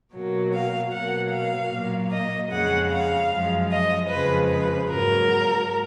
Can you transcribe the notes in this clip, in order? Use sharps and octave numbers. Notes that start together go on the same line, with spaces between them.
B2 F#3 A#3
F5
B2 F#3 A#3 F#5
F5
A#2 F#3 A#3
D#5
F2 C#3 G#3 F#5
F5
F#2 F3 G#3
D#5
F2 C#3 F3 G#3 B4
B4
G#2 F#3 A#3 A#4